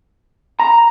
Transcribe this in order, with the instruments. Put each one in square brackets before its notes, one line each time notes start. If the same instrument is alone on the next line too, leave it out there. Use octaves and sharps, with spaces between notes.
[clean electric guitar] A#5